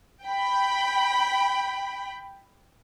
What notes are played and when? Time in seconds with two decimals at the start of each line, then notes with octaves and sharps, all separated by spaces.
0.23 G5 B5